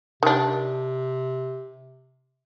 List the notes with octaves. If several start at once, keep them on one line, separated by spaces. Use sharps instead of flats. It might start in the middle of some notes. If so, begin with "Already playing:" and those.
C3 D#3 D4